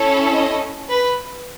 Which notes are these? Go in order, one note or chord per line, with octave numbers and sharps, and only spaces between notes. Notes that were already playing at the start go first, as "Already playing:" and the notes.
Already playing: C#4 E4 A4
D#5
B4